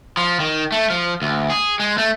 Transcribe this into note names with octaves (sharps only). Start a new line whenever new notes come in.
F3
D#3
A3
F3
D2
G#4
G#3
A3